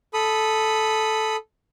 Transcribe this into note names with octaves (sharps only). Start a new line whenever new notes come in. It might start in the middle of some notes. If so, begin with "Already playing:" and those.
A4 B5 D#6